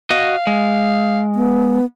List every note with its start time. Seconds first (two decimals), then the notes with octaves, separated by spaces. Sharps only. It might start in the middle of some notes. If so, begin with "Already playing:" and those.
0.10 F#4 D#5 F5
0.47 G#3
1.35 B3